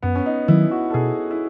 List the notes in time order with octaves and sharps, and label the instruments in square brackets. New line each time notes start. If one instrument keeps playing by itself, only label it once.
[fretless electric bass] F#2 [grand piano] B3
[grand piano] C#4
D#4
[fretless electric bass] D#3 F#3 [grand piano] E4
[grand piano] F#4
A4
[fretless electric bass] B2 [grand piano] G#4
[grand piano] E4